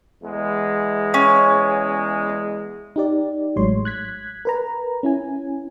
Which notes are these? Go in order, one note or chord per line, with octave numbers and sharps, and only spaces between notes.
E2 G#3
C#4
D#4 G4 D5
A1 A2 F#3 G#3 C#5 C6
F#6 G#6 B6
A#4 B4 A#5
C#4 E4 G#5